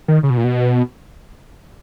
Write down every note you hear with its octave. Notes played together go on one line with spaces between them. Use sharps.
D#3
C#3
B2
A#2
B2